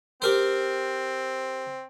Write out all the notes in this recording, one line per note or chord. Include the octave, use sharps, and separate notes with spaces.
C4 G4 A#4 C5